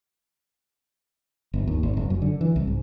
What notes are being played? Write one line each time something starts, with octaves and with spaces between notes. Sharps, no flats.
G1
D#2
G#1
F#1
F#2
D3
E3
C2
G#2